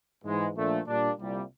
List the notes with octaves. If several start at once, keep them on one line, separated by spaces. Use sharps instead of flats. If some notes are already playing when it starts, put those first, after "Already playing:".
G#2 E3 G#3
A#1 A#2 F3 A3 D4
A#2 G3 A#3 D4
C2 A#2 G3